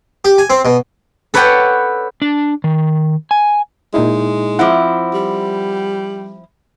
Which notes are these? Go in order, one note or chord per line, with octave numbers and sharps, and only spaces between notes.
G4
G#5
C4
B2
A4 B4 C#5 D5 F#5 G5
D4
D#3
G#5
A#2 G#3 D#4 E4
F3 C4 E4 F#5 D6
G3